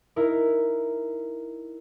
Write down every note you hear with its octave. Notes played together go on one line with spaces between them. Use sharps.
D#4 E4 A#4